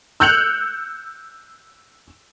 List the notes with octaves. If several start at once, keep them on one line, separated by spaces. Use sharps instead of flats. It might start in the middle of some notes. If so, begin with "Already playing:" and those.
E6 F#6 G6 C#7 F7 F#7